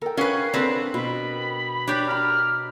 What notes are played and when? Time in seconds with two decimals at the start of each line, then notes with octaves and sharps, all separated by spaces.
0.02 A4 A#4 G5
0.17 C#4 B4 F5 F#5 G#5 C7
0.54 C4 D4 A4 B4
0.94 B2 B5
1.87 D4 G4 C#5
2.07 A#5 B5 F6